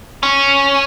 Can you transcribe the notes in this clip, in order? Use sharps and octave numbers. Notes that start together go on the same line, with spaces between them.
C#4